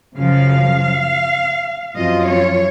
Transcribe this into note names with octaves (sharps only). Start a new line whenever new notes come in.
F#2 C#3 F3 F5
F#2 F3 C4 F4 D#5
C#5